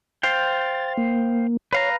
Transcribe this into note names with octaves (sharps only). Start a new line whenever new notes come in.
C5 F5 G5 A6
A#3
B4 C#5 F5 A#5